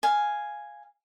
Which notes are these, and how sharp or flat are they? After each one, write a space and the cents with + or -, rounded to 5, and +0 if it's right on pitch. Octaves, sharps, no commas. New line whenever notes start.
F5 +0 G#5 +0